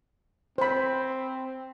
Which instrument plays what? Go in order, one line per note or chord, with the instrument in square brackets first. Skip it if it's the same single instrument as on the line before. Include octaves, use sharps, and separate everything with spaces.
[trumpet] C4 [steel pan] C5 B5